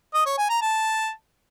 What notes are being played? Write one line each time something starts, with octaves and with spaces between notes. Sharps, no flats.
D#5
C#5
G#5
A#5
A5